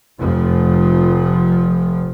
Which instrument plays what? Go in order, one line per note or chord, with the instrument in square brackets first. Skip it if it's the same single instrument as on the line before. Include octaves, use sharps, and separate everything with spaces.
[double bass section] F1 F3